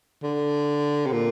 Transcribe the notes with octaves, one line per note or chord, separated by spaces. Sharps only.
D3
C3
A#2